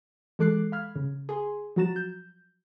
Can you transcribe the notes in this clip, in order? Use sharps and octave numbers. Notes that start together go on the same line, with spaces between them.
E3 G#3 A4 D6 F#6 C7
F5 B5 F6 G#6
C#3
G#4 G#5 C6
F3 F#3 F#4 A#5 A6 E7
G6